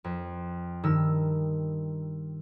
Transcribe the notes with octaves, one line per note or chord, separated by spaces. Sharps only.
F2
G2 D#3 E6